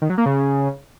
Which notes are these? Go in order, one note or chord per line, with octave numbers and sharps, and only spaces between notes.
D#3
F#3
A#3
C#3